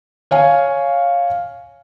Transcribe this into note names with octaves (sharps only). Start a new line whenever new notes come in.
C#5 F5 G#5